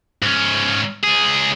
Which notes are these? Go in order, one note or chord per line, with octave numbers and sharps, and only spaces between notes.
G#2 C#4
C#2 G#4